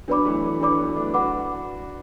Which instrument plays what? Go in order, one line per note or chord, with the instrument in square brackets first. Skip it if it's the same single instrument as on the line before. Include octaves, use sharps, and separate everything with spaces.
[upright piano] F#3 B3 [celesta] D4 B4 D5 B5 D6
[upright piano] E3 A3
E3
[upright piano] F#3 [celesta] D4 B4 D5 B5 D6
[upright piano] F#3 B3
A3 D4
[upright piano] D4 F#4 [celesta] B4 F#5 B5 D6